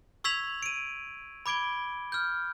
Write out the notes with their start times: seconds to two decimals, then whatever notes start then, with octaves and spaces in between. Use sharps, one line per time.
0.24 C#6 E6 G#6 B6 F7 F#7
0.63 D7 D#7
1.46 B5 D6 G#6 D7 G7
2.12 F6 G6